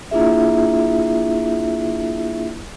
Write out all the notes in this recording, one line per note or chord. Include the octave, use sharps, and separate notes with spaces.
A#3 D4 E4 F4 G#4 E5